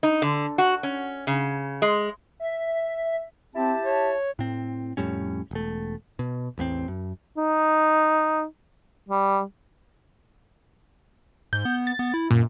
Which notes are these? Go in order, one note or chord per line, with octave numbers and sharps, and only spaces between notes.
D#4
D3
F#4
C#4
C#3
G#3
E5
C4 E4 G4 A5
C#5
A2 C4
F2 A2 G3 C#4
E1 A3
B2
A1 E2 B3 C4
F#2
D#4
G3
G#2 G6
B3
A6
B3
E4
F#2 A#2